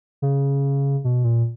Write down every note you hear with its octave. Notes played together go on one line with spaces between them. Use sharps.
C#3
B2
A#2